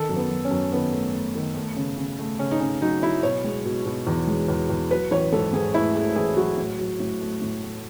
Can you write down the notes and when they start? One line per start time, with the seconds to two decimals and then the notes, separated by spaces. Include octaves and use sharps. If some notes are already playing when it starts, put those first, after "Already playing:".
Already playing: D#3 A4
0.09 F#2
0.16 B3
0.30 F#2
0.45 C#4
0.51 F#2
0.71 D#3 B3
0.93 A3
1.14 A3
1.35 D#3
1.55 A3
1.76 C#3
1.98 C#3
2.19 A3
2.39 C#3 C#4
2.51 D#4
2.60 C#3 C#4
2.82 F#3 D#4
3.02 F#3 E4
3.23 B2 C#5
3.44 G#3
3.65 B2
3.86 B2
4.07 E2
4.28 G#3
4.48 E2
4.70 E2
4.91 F#3 B4
5.11 A1 C#5
5.33 G#2 A4
5.53 G#2 G#4
5.74 A3 E4
5.95 A3 G#4
6.16 A1 G#4
6.37 F#3 F#4
6.57 A2
6.79 F#3
7.00 A2
7.20 A3
7.41 A2
7.63 A3